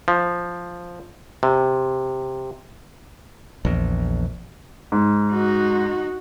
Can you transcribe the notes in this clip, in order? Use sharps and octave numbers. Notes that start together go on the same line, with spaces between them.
F3
C3
A#1 E2
G#2
D#4 F#4